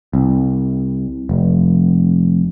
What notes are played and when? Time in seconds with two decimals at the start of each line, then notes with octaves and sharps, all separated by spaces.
0.13 C2
1.29 F1